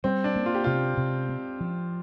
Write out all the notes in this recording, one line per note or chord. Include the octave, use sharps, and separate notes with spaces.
G3 C4
D4
A#3
F4
G4
C3 F4
C3
C4
F3